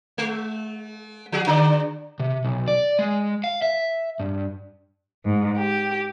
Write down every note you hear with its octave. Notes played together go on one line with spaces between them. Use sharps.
G#3
F3 F#4 G#4
D3 D4 D5
C3
B1
D5
G#3
F5
E5
G2
G#2
G4